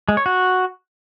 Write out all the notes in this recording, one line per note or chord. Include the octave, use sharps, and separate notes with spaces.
G#3
C#5
F#4